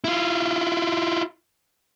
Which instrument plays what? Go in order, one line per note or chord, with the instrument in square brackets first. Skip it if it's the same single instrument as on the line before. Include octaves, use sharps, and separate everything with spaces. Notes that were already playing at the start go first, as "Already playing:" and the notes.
[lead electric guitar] E4 F4